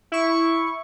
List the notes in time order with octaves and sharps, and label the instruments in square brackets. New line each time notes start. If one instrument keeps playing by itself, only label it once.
[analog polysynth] E4 C#6